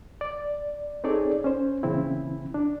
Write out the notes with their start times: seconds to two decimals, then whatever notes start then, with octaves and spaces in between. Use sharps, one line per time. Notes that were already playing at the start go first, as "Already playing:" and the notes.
0.21 D5
1.04 C4 D#4 G#4 A4 C#5 D5
1.44 C#4 C5
1.83 A#2 C#3 E3 C4 E4
2.54 D4